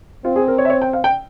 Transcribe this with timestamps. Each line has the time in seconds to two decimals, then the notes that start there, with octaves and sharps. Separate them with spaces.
0.25 C4 F4
0.36 G#4
0.48 A#4
0.58 C#5
0.65 E5
0.70 C#5
0.82 G5
0.93 F5
1.04 G5